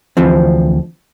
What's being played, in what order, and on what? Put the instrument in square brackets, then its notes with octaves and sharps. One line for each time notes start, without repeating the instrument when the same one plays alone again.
[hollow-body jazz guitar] D2 E3 F3 C4